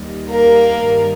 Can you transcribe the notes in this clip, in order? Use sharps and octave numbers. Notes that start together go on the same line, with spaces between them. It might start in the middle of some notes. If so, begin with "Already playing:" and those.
Already playing: D#2 D#3 G3
A#3 A#4
G2 D#3 G3